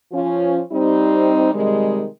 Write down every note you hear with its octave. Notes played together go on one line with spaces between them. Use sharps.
F3 C#4 F4
G3 C4 D#4
C3 D#3 G3 G#3